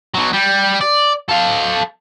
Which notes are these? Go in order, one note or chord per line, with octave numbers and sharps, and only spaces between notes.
B2 F#3
G3
D5
A4 F5